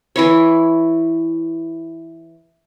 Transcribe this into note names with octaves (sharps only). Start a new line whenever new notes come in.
E3 E4 C#5